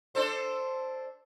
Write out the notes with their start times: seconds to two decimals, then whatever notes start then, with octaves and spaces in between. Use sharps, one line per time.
0.15 D4 A4 C5